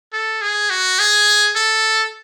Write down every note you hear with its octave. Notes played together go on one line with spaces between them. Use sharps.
A4
G#4
F#4
G#4
A4